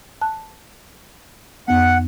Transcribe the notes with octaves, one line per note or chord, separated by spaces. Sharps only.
A5 F#6
F2 B3 F#5